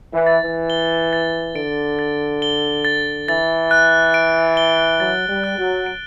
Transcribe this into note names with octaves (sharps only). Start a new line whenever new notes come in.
E3
A6
E3
G7
A6
D3 D7
A6
G7
A6
E3 A6
F#6
D7
G7
F#3 A6
G3
F#6
F#3
D7